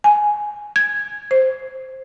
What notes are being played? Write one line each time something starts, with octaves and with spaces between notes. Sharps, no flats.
G#5
G#6
C5